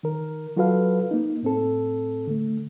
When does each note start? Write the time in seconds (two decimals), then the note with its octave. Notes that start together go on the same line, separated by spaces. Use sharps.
0.03 D#3 A#4
0.56 F#3 F4 F#4 A4 B4 F5
1.11 A#3 D#4
1.43 A2 C4 A4
2.27 D3 A3